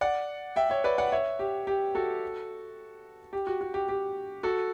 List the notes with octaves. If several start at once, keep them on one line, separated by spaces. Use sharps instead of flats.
D5 F#5
E5 G5
C#5 E5
B4 D5
D5 F#5
C#5 E5
G4
G4
F#4 A4
G4
F#4
F#4
G4
G4
F#4 A4